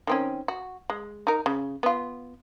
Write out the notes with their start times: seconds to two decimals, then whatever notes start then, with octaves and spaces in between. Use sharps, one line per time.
0.07 D#3 C4 C#4
0.48 F#4
0.90 G#3
1.27 D#4 A#4
1.46 C#3
1.83 B3 F4